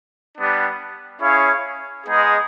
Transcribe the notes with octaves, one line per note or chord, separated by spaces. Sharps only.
G3 B3 D4
C#4 E4 G#4 C#5 F5
G#3 B3 D#4 G#4